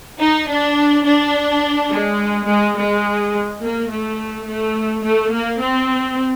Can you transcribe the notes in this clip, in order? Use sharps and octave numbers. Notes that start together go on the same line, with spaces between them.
D#4
D4
D4
G#3
G#3
G#3
A#3
A3
A3
A3
A#3
C4